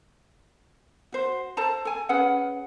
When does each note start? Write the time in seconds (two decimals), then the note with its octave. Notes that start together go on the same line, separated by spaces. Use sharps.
1.12 F#4 C5
1.57 A4 C5 A5 A#5
1.85 A4 G#5
2.09 C#4 G#4 B4 F#5